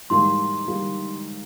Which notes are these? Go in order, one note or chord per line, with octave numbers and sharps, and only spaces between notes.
G#2 E3 G3 A#3 C6
E3 G3 A#3